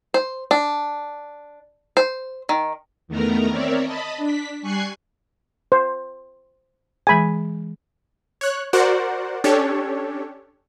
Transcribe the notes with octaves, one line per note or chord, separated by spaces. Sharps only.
C5
D4
C5
D#3
E2 D#3 A3 B3 A#4 A#5
C4 A#4 C#5 D5 E5
D#5 A5 B5
D4 B6
G3 G#5 C#6 F#6 G#6 C7
C5
E3 G#3 G#4 G#5 B5
C#5 F#6
F#4 A#4 C5 D5 F#5
C#4 D4 G4 A4 C#5